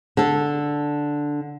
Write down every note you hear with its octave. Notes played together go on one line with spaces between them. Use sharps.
D3 A4